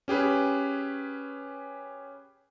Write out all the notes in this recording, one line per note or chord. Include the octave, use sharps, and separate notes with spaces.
C#4 G4 G#4 B4